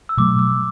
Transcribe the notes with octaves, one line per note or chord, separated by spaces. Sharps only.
E6
B2 F#3 A3 D6
E6